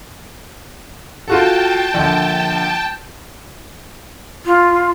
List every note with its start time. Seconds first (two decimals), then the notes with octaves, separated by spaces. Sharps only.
1.28 F4 F#4 A4 G5 A5
1.94 A#1 D3
4.46 F4